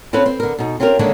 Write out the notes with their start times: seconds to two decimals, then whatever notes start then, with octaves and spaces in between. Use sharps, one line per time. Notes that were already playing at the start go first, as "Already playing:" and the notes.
0.13 C4 C#4 F4 A4 B4
0.26 C4
0.40 D3 A#4
0.59 B2 D#4
0.80 C4 C#4 F4 G4 A#4
0.99 D3 D#3 G#3 A#3 C#4 D4